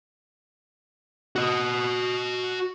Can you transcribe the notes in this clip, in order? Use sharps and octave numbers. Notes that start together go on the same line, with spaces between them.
F#4 D#5